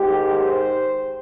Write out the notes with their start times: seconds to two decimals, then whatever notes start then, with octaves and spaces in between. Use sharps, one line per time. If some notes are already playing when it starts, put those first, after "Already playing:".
Already playing: G#2 D#3 G#3 G4
0.38 C5